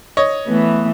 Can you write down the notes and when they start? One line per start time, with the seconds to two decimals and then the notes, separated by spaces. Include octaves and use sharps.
0.17 C#5 D#5
0.47 E3 A3 B3